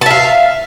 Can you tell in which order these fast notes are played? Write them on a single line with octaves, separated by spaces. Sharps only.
A5 E5 F5